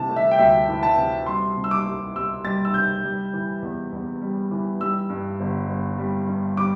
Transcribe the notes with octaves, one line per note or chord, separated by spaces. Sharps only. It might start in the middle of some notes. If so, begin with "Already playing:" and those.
Already playing: C3 E3 A5
A3
E5
G5
D2 E5
E3
A5
C3
G3 C6
C3
E6
D6
C2
C2 E6
G3 A6
E6
C3 G6
G3
E3
E2
E2
G3
E3
G3 E6
G2
G1
G1
G3
G2
G3 D6